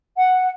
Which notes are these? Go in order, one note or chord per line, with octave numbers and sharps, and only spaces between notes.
F#5